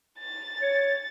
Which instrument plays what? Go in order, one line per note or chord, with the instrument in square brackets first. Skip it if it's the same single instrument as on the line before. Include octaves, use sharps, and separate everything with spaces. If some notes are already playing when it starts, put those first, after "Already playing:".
[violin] A6
[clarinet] C#5